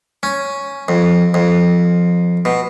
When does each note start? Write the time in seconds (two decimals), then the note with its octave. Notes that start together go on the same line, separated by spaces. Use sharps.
0.23 C#4
0.88 F2
1.34 F2
2.45 B2